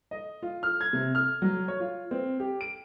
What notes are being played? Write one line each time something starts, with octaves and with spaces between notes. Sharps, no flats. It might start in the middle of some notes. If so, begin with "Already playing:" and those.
D#5
F4
F6
G#6
C3
F6
F#3
C#5
F4
C4
G4
D7